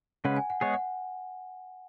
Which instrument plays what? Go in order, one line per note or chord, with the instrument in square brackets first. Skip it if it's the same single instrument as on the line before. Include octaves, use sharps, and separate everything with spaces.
[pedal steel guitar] C#3 G#3 C#4 B4 [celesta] F#5
[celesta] G#5
F#5
[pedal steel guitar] G#3 B3 G#4 C#5 [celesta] F#5
[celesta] F#5